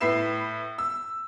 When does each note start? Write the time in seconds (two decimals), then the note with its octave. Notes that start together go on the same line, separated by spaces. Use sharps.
0.01 A2 B4 E5 C7 E7
0.78 E6